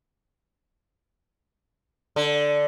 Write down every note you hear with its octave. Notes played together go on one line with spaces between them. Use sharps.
D3